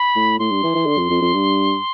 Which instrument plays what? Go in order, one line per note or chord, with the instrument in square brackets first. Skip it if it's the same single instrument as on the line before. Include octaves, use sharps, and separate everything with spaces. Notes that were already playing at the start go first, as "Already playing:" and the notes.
Already playing: [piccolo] B5
[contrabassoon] A2
[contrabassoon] A2 [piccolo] C6
[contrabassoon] G2
E3
E3
D3
F2
F2
F2
G2